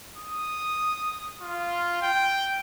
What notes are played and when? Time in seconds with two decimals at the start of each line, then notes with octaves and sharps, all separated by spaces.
0.17 D#6
1.42 F4
2.02 G5